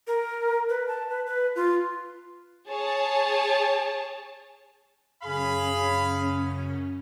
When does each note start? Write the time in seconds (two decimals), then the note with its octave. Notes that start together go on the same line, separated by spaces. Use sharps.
0.07 A#4
0.69 B4
0.88 A5
1.09 B4
1.27 B4
1.56 F4
2.68 G#4 C#5 A5
5.23 F#2 C#3 C#4 G#4 F5 B5